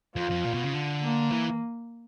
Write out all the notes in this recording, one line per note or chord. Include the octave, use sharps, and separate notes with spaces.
F2 F4
F2
A#2
B2
C#3
D3
A#3
E3